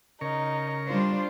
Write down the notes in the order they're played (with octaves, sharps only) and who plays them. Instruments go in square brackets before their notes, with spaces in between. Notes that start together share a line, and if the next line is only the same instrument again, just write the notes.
[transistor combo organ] C#3 A#4 C#6 [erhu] D#4
[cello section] G3 D4 C5 [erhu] F4